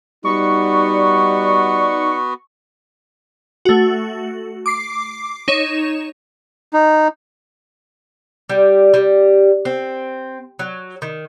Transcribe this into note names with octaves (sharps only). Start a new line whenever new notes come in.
G3 B3 D#4 F#4 D5 C#6
A3 F#4
D6 C7
D#4 C#5 E7
D#4
G3
G3
C4
F#3
D#3